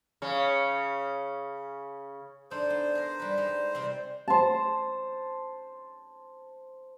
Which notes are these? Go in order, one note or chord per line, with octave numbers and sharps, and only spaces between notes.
C#3 C#4
D4 D#4 A4 C5
B3
G#4 A#4
G3 B4
G#3 D#4
C3 G3 C4
C5 A5